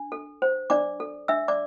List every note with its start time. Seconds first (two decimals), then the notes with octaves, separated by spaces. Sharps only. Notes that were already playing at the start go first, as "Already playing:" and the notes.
Already playing: D4
0.12 A4
0.42 C5
0.70 D4 D5 D6
1.00 A4
1.28 D4 E5 E6
1.48 D5 D6